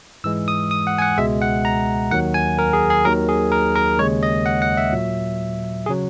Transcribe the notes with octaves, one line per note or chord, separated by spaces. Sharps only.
G#2 E3 G#3 E6
D#6
D#6
F#5
G#5
F#5
C#2 B2 G#3 E5
F#5
A#5
D#2 D#3 F#3 F#5
G#5
A#4
G#4
G#4
D#2 D#3 F#3 A#4
G#4
A#4
A#4
D#2 C#3 G#3 C#5
D#5
F#5
F#5
E5
A#2 F#3
C#3 F#3 G#4